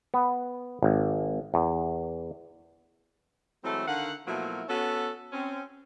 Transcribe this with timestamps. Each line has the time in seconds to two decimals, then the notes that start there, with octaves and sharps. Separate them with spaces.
0.14 B3
0.83 G#1
1.54 E2
3.63 E3 F#3 G#3 A3 C4 A4
3.87 D3 D#3 F5 F#5
4.27 B2 F3 F#3 A3 A#3 E4
4.68 B3 C#4 F#4 A4
5.32 C4 C#4